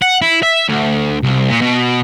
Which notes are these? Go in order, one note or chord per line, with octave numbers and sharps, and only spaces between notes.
F#5
E4
E5
D2
C2
A#2
B2